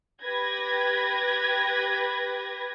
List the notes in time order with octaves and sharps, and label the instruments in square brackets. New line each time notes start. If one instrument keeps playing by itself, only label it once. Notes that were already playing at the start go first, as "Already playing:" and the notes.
[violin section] G4 B4 G#6 A#6